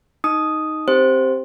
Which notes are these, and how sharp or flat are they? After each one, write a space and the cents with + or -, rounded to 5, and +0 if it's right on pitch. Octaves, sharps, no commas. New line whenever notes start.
D#4 +0 D#6 +0
C4 +10 G4 +0 C5 +0